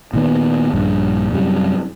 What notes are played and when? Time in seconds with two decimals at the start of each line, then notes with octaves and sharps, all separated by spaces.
0.13 A#2 D#3 B3
0.74 A#1 G2
1.32 F#2 C3 G3